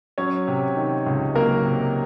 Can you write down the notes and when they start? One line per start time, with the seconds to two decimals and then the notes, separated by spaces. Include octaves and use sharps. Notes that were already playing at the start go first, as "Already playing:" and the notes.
0.18 F#3 C#4 C#5
0.48 C3
0.76 D#3
1.07 C#2
1.35 F#3 A#3 A#4
1.65 C3